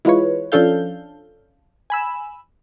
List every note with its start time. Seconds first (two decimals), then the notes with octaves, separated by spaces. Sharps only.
0.05 E3 G#3 F4 B4 C#5
0.52 F3 C#4 D4 A4 F5 G6
1.90 G#5 B5 E6